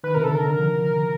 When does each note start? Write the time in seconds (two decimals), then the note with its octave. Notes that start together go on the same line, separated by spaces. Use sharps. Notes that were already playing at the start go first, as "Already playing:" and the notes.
0.04 D#3 B4
0.14 C3 A#4
0.24 A4
0.29 D3
0.35 A#4
0.42 D3
0.55 F3